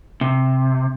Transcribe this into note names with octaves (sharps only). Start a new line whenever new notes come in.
C3